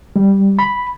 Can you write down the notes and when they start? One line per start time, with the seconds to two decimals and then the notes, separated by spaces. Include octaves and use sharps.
0.16 G3
0.59 B5